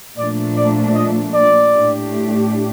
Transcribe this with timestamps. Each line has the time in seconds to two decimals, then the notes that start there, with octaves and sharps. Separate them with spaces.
0.18 A#2 F3 A3 D4 D5
0.57 D5
0.96 D#5
1.34 D5
1.73 A2 A3 D4 G4